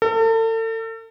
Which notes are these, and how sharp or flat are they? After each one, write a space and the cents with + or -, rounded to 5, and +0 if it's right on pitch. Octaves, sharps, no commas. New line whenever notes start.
A4 +40